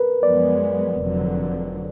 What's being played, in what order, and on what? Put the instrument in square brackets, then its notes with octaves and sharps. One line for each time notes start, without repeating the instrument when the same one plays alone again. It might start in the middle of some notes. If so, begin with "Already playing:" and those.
Already playing: [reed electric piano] A#4 B4
[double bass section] F#2 F3 G#3 B3 [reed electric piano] D5
[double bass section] F1 F2 D3 F#3